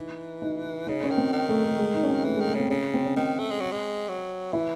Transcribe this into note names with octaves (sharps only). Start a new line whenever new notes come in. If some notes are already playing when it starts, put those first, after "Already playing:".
Already playing: E3 D#4
D#4
C#3 D#4
C#4
D#3
C4
D#3
A3
A3
A3
G#3
D#4
C#4
C4
E3 A3
G#3
D#3
A3
C#3 C4
C#3 C#4
C4
C#4
D#3 C4
A3
G#3
F#3
G#3
F#3
E3 E4